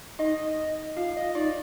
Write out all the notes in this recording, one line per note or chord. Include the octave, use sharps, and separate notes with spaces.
D#4 D#5
F4 F5
D#5
D#4 D5